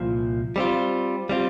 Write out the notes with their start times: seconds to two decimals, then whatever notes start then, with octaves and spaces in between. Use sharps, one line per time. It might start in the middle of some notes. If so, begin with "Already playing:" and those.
Already playing: C2 A#2 F3
0.56 G3 C4 F4
1.29 G3 C4 F4